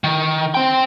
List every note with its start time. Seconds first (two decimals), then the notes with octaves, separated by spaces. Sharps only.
0.04 D#3
0.55 C4 G5